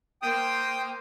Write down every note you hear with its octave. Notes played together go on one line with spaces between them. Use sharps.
A#3 C5 G5 D#6